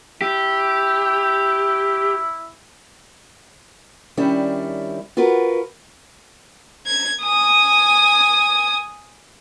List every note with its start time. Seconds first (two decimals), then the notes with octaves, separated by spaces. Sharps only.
0.22 E4 G4
4.17 D#3 G3 C#4 D4 E4
5.17 F4 F#4 A#4 B4
6.87 G#6
7.23 G#5 D#6